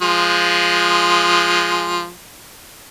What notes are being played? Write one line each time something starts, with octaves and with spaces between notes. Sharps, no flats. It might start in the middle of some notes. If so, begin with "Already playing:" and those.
F3 G#3